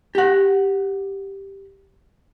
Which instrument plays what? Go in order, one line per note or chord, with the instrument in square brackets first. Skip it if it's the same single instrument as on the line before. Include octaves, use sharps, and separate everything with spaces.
[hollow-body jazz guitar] G4 F#5